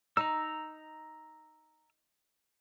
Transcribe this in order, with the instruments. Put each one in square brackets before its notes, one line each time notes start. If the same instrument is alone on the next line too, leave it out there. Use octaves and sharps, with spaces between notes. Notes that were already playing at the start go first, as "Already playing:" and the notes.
[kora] D#4 [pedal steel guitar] A#5 E6